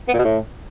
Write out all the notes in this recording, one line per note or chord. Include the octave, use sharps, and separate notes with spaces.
B3
A#2
B2
A2